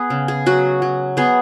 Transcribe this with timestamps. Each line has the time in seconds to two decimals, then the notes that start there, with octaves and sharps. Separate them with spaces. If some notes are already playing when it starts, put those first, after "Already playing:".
Already playing: B3 G#4 B4
0.10 C#3
0.28 G#4
0.46 F#3 F#4
0.82 F#3
1.17 B3 G#4